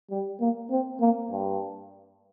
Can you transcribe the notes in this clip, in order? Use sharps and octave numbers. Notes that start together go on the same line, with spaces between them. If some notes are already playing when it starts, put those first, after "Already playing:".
G3
A#3
C4
A#3
G2